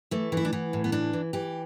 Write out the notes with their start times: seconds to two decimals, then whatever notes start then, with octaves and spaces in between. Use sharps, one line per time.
0.11 E3 A3
0.32 E3
0.37 E4
0.45 D4
0.53 E3 B3
0.73 A2
0.84 B3
0.92 E3 D4
1.13 E3
1.33 E3 G4